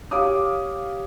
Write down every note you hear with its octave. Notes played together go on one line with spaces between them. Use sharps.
G4 C#5 F5 D6 D#6